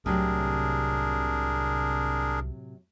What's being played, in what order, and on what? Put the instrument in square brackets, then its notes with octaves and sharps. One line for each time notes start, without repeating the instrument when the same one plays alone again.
[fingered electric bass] C2 [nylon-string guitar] A2 C3 F#3 [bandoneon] D4 G#4 A#4